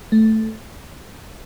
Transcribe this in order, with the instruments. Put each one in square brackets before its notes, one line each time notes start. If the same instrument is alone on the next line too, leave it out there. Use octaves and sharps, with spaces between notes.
[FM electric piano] A3